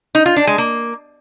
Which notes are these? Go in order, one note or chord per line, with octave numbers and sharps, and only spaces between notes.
D#4
F4
D4
G#3
A#3